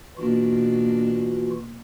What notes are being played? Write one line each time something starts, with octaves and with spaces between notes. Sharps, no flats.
B2 E3 A#3 D4 F4 F#4